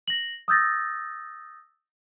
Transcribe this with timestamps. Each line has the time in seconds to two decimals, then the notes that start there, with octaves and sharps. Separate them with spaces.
0.08 A#6 F#7
0.48 D#6 E6 G6 A6 A#6